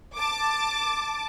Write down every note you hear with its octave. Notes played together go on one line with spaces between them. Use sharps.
A5 D6